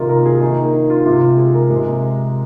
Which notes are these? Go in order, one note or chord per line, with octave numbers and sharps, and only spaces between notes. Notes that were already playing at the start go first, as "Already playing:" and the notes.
Already playing: C3 D#3 A#3 D#4 F4
A#4
G#4
D#3 A#3 D#4
D#4
F4
C3 G#3 F4
F4
G#4
A#4
C3 G#3